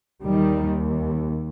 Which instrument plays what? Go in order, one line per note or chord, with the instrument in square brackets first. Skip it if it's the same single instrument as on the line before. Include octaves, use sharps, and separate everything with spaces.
[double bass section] D#2 D#3 G3